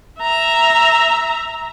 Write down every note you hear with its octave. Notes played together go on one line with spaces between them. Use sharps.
E5 A#5